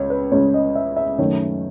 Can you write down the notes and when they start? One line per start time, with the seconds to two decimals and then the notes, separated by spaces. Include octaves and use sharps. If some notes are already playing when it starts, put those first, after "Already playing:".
Already playing: C#2 C#5
0.10 B4
0.31 C#2 C#3 G#3 C#5
0.54 D#5
0.75 E5
0.96 E5
1.18 F#2 D#3 A3 C#5